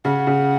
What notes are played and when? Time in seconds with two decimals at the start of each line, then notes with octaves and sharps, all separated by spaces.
0.05 C#3 F#5
0.27 C#3